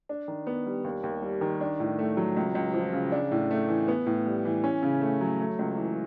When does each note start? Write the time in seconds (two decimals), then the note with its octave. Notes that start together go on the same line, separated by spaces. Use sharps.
0.09 D4
0.28 D#3
0.47 B3
0.66 G3
0.84 D#2
1.04 D#2
1.22 G3
1.41 D#3
1.61 D4
1.80 A2
1.99 A3
2.17 F#3
2.36 C#2
2.55 C#2
2.74 F3
2.93 C#3
3.12 D4
3.31 A2
3.51 A3
3.69 E3
3.88 B3
4.06 A2
4.26 G3
4.45 E3
4.64 C#4
4.83 C#3
5.01 A3
5.21 F#3
5.39 A3
5.59 C#2
5.77 E3